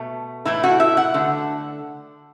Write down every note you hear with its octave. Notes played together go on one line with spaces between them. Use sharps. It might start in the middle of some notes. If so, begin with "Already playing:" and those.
Already playing: B2 A3
A2 E3 A3 E4
F#4
E5
F#5
D3 A3